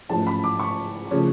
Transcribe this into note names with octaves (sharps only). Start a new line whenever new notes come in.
A1 G#2 F3 A3 C#4 A5
B5
D6
C#6
C#3 F3 A3 C#4